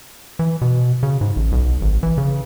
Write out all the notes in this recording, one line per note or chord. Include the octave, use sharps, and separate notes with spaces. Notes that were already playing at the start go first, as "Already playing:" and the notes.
E3
B2
C#3
G#2
A1
B1
G#1
E3
C#3